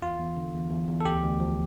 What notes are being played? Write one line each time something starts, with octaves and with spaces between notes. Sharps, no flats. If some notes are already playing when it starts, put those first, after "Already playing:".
E2 F4
E2
D3
E2
E2
E2
A4
D2 G4
D2
F3